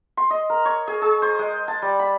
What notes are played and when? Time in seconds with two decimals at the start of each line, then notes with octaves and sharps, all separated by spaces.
0.17 C6
0.30 D#5
0.50 A#4
0.65 C#5
0.88 G#4
1.02 G#4
1.22 C5
1.39 G#3
1.68 A5
1.82 G3
1.99 B5